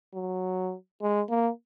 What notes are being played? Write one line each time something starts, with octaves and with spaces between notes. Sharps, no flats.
F#3
G#3
A#3